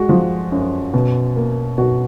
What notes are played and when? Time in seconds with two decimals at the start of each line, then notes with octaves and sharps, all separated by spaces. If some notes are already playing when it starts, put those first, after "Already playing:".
Already playing: G#3 F#4
0.09 F3
0.52 F#2
0.94 B2
1.36 A#3
1.78 B2 F#4